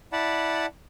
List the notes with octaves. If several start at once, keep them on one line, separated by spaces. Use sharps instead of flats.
E4 D5 F#5 A5 B5